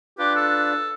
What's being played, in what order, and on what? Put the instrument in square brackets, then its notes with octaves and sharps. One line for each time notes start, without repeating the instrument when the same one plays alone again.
[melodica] D4 F4 B4 [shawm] G4
[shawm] A4